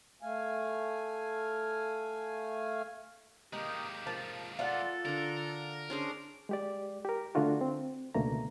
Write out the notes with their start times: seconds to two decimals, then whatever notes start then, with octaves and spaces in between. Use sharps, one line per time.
0.22 A3 F5 G#5
3.53 D#3 G#3 A#3 D#4 G4
4.07 F3 A#4 A5
4.59 F4 A4 D5 F#5
5.05 D3 D4 A#4
5.90 C#4 D4 G#4 C5
6.49 G#3 G4 D5
7.05 G4 A#4
7.35 D3 A3 D4 F4 F#4
7.61 C4
8.15 C#2 B2 D3 A3 A#3 A#5